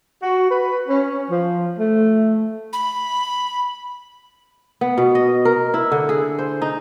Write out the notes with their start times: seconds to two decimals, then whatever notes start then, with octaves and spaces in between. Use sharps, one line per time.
0.21 F#4
0.51 B4
0.88 C#4
1.31 F3
1.78 A3
2.73 B5
4.81 B3
4.98 B2
5.15 D#5
5.45 A#4
5.74 E4
5.92 D3
6.09 G#4
6.39 C5
6.62 D#4